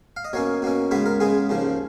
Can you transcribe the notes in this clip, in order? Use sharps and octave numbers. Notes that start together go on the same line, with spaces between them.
F5
D#5
B2 A#3 C#4 C#5
B2 A#3 C#4
C#3 G#3 B3 B4
A#4
C#3 G#3 B3 G#4
D#2 C#3 F3